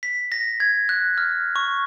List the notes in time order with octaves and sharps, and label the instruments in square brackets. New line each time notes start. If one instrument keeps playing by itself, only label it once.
[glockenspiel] B6
A#6
G#6
F#6
F6
C#6